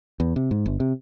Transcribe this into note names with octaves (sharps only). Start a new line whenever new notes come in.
E2
C3
G#2
G1
C3